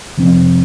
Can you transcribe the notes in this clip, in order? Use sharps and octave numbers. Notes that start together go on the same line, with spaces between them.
F2 C3 F3 C4